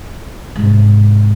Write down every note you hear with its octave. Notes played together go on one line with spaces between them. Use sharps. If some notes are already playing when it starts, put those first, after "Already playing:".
G#2 C3